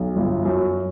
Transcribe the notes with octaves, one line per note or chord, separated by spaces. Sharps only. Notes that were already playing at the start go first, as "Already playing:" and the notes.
Already playing: B1
G1
F#2